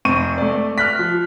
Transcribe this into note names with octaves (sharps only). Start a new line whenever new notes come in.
F1 C4 C#6 D#7
A3 D5
F6 F#6 B6
F3